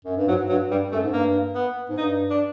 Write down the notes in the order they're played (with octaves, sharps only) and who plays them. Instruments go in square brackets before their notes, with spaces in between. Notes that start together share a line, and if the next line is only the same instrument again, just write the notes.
[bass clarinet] F#2
G2
[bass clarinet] G#2 [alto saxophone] F#3
[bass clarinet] G2 [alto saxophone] F#3
[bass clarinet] G2 [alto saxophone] G3
[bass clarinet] F#2 [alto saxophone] A3
[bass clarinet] G#2
[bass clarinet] G2 [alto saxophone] A#3
[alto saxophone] B3
[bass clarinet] G#2
[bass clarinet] G2 [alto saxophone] D#4
[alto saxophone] D4